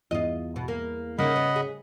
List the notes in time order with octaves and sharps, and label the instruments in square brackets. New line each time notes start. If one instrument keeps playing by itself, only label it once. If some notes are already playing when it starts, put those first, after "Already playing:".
[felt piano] E2 [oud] F4 D#5
[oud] B2
A#3
[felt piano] C#3 [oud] A#3 D#4 [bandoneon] D#5 F#5 B5
[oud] B3
G#4